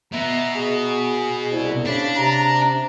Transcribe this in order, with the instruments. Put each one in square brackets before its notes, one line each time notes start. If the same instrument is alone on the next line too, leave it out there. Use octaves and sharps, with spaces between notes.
[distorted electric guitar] B2 [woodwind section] E5 A#5
[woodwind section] G#4
C2 E4
[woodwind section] C#3 B5 [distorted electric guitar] D4
[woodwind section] C3 [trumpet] A#5